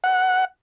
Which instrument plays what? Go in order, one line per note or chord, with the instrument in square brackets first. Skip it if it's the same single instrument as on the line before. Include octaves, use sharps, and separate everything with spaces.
[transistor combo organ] F#5